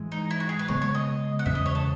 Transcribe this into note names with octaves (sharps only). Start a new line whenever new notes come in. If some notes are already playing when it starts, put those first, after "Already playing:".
Already playing: G#2 E3 G#3
D#4
E4
F#4
G#4
B4
C#3 G#3 B3 C#5
C#5
D#5
F#5
E2 C#3 G#3 C#4 E5
D#5
C#5
A4